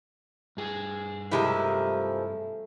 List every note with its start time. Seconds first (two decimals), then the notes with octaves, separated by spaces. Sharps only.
0.57 G2 G#4 G#5
1.31 C3 F3 G#3 A3 E4 A#4